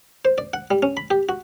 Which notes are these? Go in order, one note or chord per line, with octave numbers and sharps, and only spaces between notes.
C5
D5
F#5
G3
C#4
B5
G4
F#4